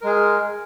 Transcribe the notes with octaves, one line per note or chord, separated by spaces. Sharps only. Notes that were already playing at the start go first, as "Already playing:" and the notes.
G#3 G#4 A#4